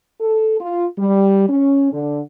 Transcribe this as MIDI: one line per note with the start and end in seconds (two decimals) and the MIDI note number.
0.20 0.57 69
0.60 0.86 65
0.98 1.46 55
1.49 1.91 61
1.92 2.20 50